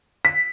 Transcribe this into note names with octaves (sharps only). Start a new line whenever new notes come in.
B6